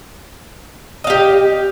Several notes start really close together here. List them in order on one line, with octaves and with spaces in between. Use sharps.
D#5 F5 G4